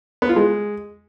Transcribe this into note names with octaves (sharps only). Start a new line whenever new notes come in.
B3
F4
G#3